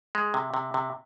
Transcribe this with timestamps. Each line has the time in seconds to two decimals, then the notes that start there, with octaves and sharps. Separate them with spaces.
0.15 G#3
0.34 C3
0.54 C3
0.74 C3